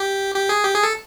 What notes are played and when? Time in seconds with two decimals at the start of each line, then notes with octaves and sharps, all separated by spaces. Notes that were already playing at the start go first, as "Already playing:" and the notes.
Already playing: G4
0.35 G4
0.49 G#4
0.64 G4
0.74 G#4
0.83 A4